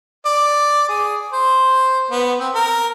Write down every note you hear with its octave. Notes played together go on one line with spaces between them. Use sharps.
D5
G#4
C5
B3
C4
A#4